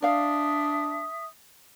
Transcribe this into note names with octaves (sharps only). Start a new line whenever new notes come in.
D4 D5 E5 F5 D#6